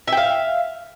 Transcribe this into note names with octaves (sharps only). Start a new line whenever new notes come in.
E5 F5 G5